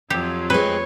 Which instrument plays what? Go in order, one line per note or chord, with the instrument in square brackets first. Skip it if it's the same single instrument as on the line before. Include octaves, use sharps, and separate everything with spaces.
[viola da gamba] F2 F3 F#3 [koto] G4
[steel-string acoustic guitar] G#3 C4 [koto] B4 [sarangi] C#5